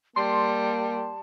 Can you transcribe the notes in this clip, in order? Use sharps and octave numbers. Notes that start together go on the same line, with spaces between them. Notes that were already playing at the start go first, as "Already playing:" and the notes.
G3 A#3 A5 C6